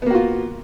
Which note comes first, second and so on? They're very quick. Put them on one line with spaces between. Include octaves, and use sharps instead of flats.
B3 A#3 F#4 F4